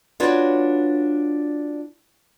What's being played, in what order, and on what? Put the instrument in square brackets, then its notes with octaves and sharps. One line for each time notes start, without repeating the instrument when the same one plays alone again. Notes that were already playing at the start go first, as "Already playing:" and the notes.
[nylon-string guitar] D4 F4 F#4 B4 C#5 D5